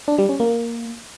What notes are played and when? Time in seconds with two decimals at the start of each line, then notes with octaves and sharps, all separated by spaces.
0.08 D4
0.18 G3
0.29 C#4
0.40 A#3